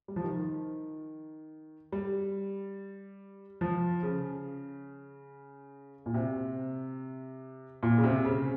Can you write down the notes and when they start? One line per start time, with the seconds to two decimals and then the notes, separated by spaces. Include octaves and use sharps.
0.08 G3
0.16 F3
0.24 D#3
1.92 G3
3.61 F3
4.03 C#3
6.06 A#2
6.14 C3
7.83 A#2
7.98 C#3
8.04 C3
8.25 C#3